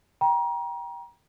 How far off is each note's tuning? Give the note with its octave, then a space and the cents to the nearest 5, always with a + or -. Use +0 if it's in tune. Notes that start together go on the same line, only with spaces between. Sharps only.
G5 +0 A#5 +30